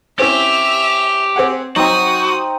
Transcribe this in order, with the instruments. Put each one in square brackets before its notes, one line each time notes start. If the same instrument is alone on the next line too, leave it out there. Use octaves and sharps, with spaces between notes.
[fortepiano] C4 C#4 E4 [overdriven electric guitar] G4 [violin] E5 F7
[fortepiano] C4 G#4 F#5
[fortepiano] F#3 [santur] C4 D#4 [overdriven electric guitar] F#4 [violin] D#6